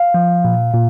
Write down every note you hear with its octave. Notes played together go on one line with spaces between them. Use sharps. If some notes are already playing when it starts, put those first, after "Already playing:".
Already playing: F5
F3
A#2
A#2